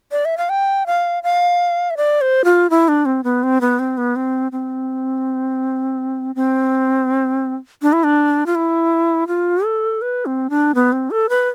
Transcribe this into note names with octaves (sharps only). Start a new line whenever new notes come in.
D5
E5
F5
G5
F5
F5
E5
D5
C5
F4
E4
D4
C4
B3
C4
B3
C4
B3
C4
C4
C4
D4
E4
D4
F4
E4
F4
A4
B4
C4
D4
B3
C4
A4
B4